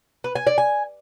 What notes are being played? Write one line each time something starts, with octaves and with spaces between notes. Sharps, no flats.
B4
G#5
D5
G#5